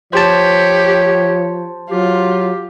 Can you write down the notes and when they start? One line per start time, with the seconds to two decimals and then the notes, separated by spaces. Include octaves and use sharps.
0.13 F3 G4 C5 C#5 A5
1.91 F#3 F4 G4